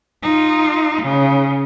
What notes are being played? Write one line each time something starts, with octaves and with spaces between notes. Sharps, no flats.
D#4 F4
C#3